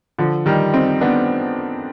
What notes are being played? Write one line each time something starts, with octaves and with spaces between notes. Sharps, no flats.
D3 F3
D#3 G3
C4 D#4
B3 D4